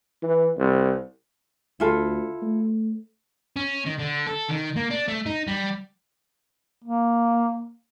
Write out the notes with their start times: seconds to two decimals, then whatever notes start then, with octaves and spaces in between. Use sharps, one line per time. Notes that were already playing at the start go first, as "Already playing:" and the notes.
0.22 E3
0.57 C2
1.80 D2 E4 F4 A4
2.42 A3
3.56 C#4
3.86 D#3
3.98 D3
4.27 A4
4.50 D#3
4.77 A#3
4.91 D4
5.08 A3
5.26 D#4
5.47 G3
6.84 A#3